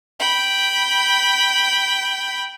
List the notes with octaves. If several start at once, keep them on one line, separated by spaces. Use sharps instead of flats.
G5 B5